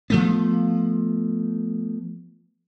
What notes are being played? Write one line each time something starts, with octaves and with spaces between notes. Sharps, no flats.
F3 A3 B3